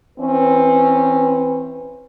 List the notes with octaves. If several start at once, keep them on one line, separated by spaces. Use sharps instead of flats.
E3 C4 C#4 B4